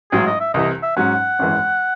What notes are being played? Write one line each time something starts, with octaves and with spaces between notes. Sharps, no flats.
A1 G#2 F#3 G#4
D#5
E5
C2 C3 E3 D#5
E5
G#2 F#3 C#4 F#5
G#1 F#2 E3 G#3